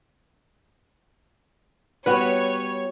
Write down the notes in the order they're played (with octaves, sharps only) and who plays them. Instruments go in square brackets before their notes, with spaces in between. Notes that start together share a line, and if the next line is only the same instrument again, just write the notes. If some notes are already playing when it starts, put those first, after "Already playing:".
[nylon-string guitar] G3 B3 F#4 [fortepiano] B4 [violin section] C#5